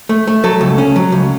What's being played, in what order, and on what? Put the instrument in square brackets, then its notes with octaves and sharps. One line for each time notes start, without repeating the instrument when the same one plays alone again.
[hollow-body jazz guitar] A3
A3
F#3 A4
C#2
C#4
F#3
C#2